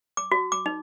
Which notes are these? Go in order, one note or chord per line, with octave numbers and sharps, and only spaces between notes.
D6
F#4
D6
D#4